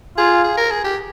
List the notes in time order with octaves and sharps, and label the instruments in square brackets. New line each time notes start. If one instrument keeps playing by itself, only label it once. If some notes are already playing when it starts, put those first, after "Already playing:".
[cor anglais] F4 [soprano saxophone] G#4
[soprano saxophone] G#4
A#4
G#4
G4